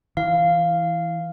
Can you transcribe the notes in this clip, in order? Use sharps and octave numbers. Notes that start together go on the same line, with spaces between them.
E3 F5